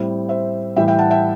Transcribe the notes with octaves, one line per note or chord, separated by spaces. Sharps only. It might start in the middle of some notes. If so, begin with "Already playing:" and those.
Already playing: A2 G3 C4
C5 E5
A2 E3 G3 E5 G5
E5 G5
F#5 A5
E5 G5